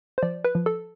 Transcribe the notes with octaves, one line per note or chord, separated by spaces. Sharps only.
C5
F3 D5
B4
F3
A4